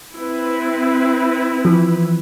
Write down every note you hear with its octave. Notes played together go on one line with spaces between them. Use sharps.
C4 E4 B4
E3 F3